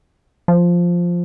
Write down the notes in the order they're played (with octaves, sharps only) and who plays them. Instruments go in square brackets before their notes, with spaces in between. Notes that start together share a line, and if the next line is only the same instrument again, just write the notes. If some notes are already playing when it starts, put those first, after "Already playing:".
[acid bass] F3